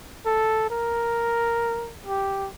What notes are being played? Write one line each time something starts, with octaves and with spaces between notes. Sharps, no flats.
A4
A#4
G4